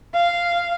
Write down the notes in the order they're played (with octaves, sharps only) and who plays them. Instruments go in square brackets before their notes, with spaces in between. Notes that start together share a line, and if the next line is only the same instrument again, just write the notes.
[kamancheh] F5